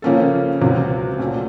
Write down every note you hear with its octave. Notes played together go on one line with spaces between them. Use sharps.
C#3 F3 A#3 C#4 A4
C#2 C3 F#3
A#2 F#3 A3 C#4